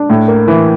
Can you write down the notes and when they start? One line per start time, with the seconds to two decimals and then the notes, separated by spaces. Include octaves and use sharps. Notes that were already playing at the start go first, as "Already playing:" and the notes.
Already playing: D4
0.10 A2
0.28 A#3
0.48 E3